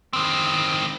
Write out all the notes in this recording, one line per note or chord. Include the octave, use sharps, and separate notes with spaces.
D#3 C4